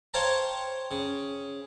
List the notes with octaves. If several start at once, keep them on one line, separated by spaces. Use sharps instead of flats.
C5 C#5 F5 G5 A5 A#5
C#3